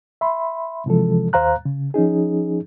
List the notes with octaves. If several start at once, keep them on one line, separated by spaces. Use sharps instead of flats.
E5 B5 C6
C3 E3 F3 G#3 A4
D#2 C5 F5 A#5 F#6
C#3
F3 C#4 D#4 G#4